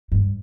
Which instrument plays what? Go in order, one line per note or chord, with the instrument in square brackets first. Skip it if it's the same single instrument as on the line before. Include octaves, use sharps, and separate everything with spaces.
[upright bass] G2